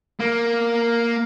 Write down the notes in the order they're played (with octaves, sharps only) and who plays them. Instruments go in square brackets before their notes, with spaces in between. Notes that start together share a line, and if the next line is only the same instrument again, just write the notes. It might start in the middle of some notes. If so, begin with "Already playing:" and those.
[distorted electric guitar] A#3